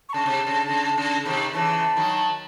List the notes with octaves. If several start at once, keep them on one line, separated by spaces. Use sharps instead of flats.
C#6
C#3 A5
C3
C#3
C#3
C#3
C3 D#3
C#3 E3 A5
D#3 F#3